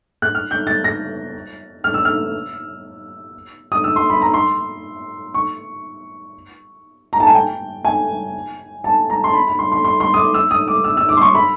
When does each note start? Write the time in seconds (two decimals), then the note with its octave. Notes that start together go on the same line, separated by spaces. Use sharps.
0.22 F#6
0.35 F6
0.51 G6
0.67 A6
0.84 A#6
1.84 F6
1.94 E6
2.05 F6
3.72 D#6
3.84 E6
3.96 C6
4.10 B5
4.22 A#5
4.34 C6
5.34 C#6
7.13 A#5
7.20 A5
7.27 G#5
7.35 G5
7.85 G#5
8.84 A5
9.10 A#5
9.24 C6
9.34 B5
9.47 B5
9.59 C6
9.72 C6
9.84 C6
10.00 C6
10.14 D#6
10.17 D6
10.34 E6
10.51 D#6
10.68 D6
10.84 E6
10.97 E6
11.09 D6
11.17 C6
11.22 C#6
11.35 B5